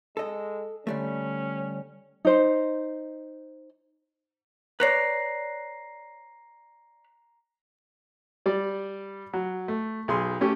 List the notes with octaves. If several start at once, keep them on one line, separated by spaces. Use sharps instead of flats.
G#3 A4 D#5
D3 G3 A3 C#4
D#4 C5
B4 C#5 D5 A#5 A#6 C7
G3 D5
F#3
A3
B1 G#4 C6
A3 C#4 G4